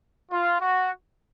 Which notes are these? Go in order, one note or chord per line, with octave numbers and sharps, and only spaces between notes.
F4
F#4